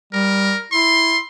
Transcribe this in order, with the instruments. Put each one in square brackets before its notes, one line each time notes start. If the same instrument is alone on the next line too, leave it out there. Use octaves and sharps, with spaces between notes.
[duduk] G3 [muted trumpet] A#4
[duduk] E4 [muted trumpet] C6